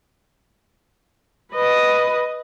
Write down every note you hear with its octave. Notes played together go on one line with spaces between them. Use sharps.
B4 D#5